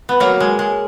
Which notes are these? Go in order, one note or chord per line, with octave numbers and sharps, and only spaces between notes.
B3
F#3 A#3
G#3
G#3